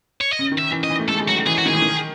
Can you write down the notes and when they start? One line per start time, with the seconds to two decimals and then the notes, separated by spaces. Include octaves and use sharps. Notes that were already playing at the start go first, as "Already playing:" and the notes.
0.21 C#5
0.33 D#5
0.39 C#3
0.51 D#3
0.59 E5
0.71 E3
0.84 D#5
0.90 E3
0.99 A3
1.08 G#3 A4
1.20 G#3
1.28 F#3 F#4
1.46 E3 G#4
1.58 F#4
1.65 D#3 G#4
1.73 E3
1.82 D#3